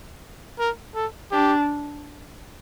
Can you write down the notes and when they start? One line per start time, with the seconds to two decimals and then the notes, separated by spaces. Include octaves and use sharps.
0.59 A#4
0.95 A4
1.32 D4 G4